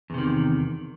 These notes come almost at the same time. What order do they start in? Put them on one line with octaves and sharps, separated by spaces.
E2 C3 D#3